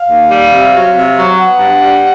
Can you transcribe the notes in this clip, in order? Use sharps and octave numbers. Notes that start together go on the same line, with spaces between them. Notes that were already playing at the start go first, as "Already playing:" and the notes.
Already playing: F5
D#2
G3
C3
F#3
C3
F#3
B3 F#5
G2
G3